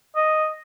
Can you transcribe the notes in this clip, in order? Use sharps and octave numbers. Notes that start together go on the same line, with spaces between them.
D#5